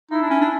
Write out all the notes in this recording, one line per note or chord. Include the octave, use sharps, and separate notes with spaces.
D#4 E4
D4
C#4
D4